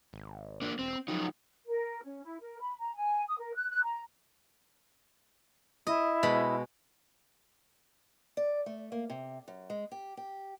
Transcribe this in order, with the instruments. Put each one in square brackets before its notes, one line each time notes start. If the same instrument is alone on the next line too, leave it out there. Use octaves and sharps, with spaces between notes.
[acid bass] G#1
[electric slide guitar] A#3 D4
[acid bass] E1 [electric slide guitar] C4
[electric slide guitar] F3 D#4 [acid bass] F#3
[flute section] A#4
C#4
E4
A#4
B5
A#5
G#5
D#6
A#4
F#6
F#6
A#5
[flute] E4 [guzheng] D#5
[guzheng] B2 G#3 B5
[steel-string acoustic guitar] D5
A3
A#3
C3
F#2
G#3
G4
G4